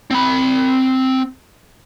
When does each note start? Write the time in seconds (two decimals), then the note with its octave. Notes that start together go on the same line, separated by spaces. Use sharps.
0.11 C4 B5